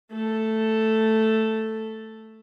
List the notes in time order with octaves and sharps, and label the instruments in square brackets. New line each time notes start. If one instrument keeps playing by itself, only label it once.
[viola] A3 A4